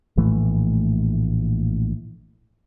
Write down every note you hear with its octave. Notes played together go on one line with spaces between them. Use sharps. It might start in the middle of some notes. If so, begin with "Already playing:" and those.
A#1 A2 E3 A3